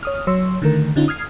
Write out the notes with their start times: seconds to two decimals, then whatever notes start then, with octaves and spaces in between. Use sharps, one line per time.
0.03 C#5 D#6 F6
0.27 F#3 C#5 C6 E6
0.62 D3 D#3 A3 A#4
0.96 D3 C#4 D#4 F4
1.08 D#6 F6 G#6 C7